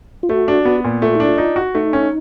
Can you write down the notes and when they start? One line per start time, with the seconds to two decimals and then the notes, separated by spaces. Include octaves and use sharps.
0.23 F4
0.29 A3 F#4
0.48 D4
0.65 B3
0.84 A#2
1.02 A3 F4
1.15 D4 E4
1.29 F4
1.38 D#4
1.56 F#4
1.75 A3 D#4
1.93 C#4